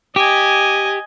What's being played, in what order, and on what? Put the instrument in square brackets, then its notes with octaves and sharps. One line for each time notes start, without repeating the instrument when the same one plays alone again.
[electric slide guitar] G4 [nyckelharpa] D#5 G#5